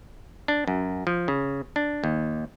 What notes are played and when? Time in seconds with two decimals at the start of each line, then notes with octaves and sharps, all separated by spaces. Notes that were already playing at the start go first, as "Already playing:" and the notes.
0.48 D4
0.68 F#2
1.07 F3
1.28 C#3
1.76 D4
2.04 D#2